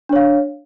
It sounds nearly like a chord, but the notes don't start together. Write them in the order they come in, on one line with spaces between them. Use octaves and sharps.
D4 C#5 F5